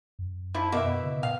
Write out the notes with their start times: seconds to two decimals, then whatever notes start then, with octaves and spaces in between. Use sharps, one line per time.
0.19 F#2
0.55 F3 D4 E4 F4
0.72 B2 A#3 E4 E5 D6
1.03 C#3
1.23 A#2 F5